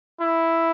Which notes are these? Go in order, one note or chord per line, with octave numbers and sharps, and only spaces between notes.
E4